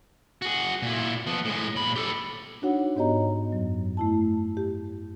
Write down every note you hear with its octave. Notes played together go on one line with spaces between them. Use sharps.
F#4 G#4
A#2 E4
F3 B3
A2 G#3
A#2 B5
G4 A4
D4 D#4 F#4 C#5 F#5
G#2 B3 G4 C#5 D#5 A#5
F#2 F#3
A3 E4 A5
G4